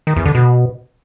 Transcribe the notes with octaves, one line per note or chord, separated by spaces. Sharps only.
D#3
E2
D3
B2